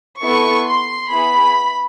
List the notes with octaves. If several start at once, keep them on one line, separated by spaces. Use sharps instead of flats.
B3 E4 A4 C#6
C6
B3 E4 G#4 B5